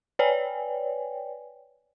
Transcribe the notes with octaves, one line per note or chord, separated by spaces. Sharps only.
B4 C#5 D5 G5 G#5